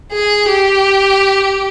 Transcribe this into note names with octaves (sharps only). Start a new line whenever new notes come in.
G#4
G4